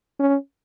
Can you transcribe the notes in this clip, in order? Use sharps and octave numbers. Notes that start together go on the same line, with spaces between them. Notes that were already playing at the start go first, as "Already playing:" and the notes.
C#4